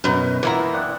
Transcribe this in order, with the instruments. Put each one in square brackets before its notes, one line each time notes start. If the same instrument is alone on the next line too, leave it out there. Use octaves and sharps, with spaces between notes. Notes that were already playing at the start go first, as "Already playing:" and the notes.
[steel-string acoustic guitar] F#2 B2 [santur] D#4 B4 C5
[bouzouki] E3 E4 A#5 [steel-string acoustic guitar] A#3 [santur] B3 F4
[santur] C4 D4 F#5